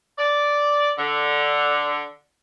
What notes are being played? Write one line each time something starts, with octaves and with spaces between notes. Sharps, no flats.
D5
D3